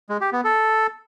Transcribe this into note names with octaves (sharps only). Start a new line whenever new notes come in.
G#3
G4
B3
A4